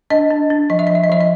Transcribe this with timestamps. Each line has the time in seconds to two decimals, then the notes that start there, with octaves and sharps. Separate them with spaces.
0.10 D4 D#5
0.30 D4
0.50 D4
0.70 F3 D#5
0.79 E5
0.87 F3 D#5
0.95 E5
1.04 D#5
1.10 F3 E5
1.21 D#5